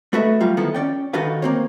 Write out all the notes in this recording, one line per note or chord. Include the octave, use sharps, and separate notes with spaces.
A3 F#4 B4 D#5 E5
F#3 G3 F4
D#3 F3 B3 E4 A4
C#4 D5 G5
D#3 D#4 F#4 A4 B4 F5
A#3 C4 C#5